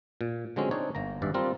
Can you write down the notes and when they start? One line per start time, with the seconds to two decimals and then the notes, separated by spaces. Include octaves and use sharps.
0.21 A#2
0.56 D3 F#3 G#3 C4 C#4
0.71 C4 D4 D#4 C#5 D5
0.95 G1 A#3 A#5
1.22 G#1 G2 D5 E5
1.34 G3 C4 F4 A#4